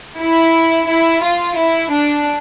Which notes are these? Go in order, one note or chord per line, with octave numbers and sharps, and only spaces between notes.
E4
E4
F4
E4
D4